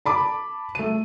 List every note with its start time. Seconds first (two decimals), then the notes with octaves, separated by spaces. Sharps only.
0.06 A5 B5 D6
0.75 A3 D#7